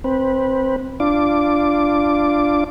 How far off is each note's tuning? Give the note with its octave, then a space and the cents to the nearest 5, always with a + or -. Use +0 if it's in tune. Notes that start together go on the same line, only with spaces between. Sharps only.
C4 +10 B4 -10
D4 +0 F4 -15 D6 +0